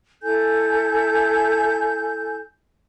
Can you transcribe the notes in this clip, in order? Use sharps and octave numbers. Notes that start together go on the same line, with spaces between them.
E4 A4 G#5 G6